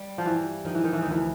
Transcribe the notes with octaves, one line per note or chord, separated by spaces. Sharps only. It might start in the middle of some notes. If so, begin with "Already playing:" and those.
Already playing: G3
F3
G2 E3
D#3 F3
E3
D#3
E3
D2 D#3
E3